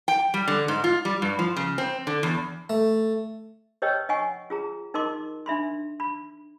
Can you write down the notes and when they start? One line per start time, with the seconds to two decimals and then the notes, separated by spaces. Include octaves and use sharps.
0.08 G5
0.34 G3
0.48 D3
0.68 G#2
0.84 F4
1.05 G3
1.22 G2
1.39 F3
1.57 C#3
1.78 C4
2.07 D3
2.23 E2
2.70 A3
3.82 G4 B4 C#5 D#5 G5 E6
4.09 D#5 F#5 G#5 C#6
4.50 F4 G#4 A#5
4.94 D#4 A#4 D#5 C6 D6
5.46 D4 E5 B5 C6
6.00 B5